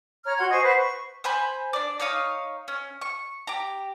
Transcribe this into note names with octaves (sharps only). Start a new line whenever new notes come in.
C#5 A#5 F6
F#4 F#5 C6 G#6
C5 D#5 G#5 C#6
B4 C5 F#5
C#6
C5 G#5 B5 G6
D4 D5
D#4 C#5 F5 D#6
C#4
C#6
G4 A#5